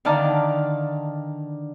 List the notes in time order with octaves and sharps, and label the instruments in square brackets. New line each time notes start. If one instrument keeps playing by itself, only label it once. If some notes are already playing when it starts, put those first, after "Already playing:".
[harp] D3 D#3 D5 F5 A5 A#5